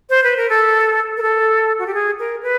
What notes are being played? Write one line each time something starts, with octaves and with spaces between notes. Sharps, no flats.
C5
B4
A#4
A4
A#4
A4
F#4
G4
G#4
A#4
B4